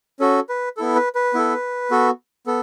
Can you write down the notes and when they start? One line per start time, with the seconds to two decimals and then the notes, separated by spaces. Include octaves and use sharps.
0.20 C#4 F#4 A4
0.49 B4
0.77 B3 E4 A4
0.95 B4
1.15 B4
1.34 B3 E4 A4
1.91 B3 F#4 A4
2.47 B3 A4